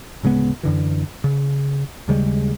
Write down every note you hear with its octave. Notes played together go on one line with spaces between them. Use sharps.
D1 C#3 G#3 B3
F#2 D3 E3
C#3
D#2 C#3 G3 G#3